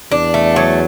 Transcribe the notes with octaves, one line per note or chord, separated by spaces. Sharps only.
E2 D4
A3
F#3